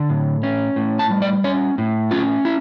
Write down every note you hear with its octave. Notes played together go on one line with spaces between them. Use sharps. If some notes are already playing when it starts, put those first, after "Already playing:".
Already playing: D3
A2
C#4
A2
A5
G3
D5
C#4 C#5
A2
C#4 F4
E4